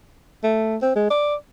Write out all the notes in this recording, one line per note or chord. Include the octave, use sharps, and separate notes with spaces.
A3
C4
G#3
D5